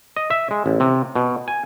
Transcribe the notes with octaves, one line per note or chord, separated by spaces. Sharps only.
D#5
E5
G#3
A1
C3
B2
G#5